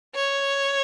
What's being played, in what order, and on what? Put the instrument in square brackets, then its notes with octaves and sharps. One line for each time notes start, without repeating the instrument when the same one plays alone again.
[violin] C#5